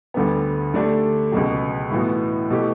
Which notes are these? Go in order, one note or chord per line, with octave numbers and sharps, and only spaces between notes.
D2 D3 G3 B3
D3 A3 D4 G4
C#2 B2 F#3
A2 E3 B3 F#4
B2 A3 E4 G4